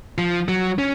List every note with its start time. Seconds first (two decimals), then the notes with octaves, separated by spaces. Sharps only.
0.18 F3
0.48 F#3
0.79 C#4